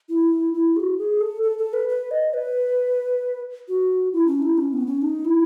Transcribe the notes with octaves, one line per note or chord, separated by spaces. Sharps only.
E4
E4
G#4
F#4
G#4
A4
A4
A4
B4
B4
D#5
B4
F#4
E4
C#4
E4
C#4
B3
C#4
D#4
E4